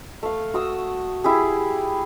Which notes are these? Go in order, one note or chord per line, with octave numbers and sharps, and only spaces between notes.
A3 F5
F#4 D#6 E6
E4 G4 G#4